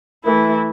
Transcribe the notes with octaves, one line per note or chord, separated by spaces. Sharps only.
E3 A3 E4